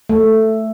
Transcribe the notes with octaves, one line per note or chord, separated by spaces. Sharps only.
A3